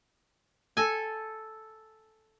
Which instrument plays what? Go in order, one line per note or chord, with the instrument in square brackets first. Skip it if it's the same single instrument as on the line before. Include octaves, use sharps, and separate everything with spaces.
[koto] A4 G#5